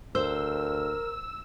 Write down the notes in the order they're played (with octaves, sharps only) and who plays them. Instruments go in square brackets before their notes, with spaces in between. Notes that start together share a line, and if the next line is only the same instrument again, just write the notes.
[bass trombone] D2 [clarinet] A#4 [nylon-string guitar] C5 [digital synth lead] E6